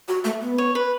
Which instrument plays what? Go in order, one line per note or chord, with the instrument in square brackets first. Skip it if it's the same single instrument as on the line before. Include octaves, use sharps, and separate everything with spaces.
[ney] F#4
A3
B3
[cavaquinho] C#5
B4